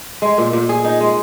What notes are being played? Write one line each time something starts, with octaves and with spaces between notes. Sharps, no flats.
G#3
A#2
A#2
G#4
D#4
G#3